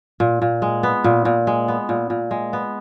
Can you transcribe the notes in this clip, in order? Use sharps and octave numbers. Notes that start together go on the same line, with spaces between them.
A#2
A#2
G#3
B3
A#2
A#2
G#3
B3
A#2
A#2
G#3
B3